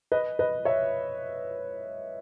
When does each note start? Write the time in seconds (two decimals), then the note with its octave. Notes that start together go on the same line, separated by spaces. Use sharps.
0.12 B4 D#5
0.39 B4 D#5
0.65 C#5 E5